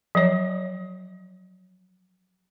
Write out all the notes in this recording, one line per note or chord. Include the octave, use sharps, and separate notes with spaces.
F3 F#3 C#5